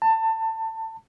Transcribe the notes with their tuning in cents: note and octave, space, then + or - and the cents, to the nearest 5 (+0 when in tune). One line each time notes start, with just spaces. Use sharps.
A5 +25